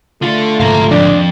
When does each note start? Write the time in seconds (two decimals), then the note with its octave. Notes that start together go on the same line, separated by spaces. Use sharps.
0.22 D3 A3 F4 A4
0.60 D2 G#2 F5 A#5
0.91 F2 D4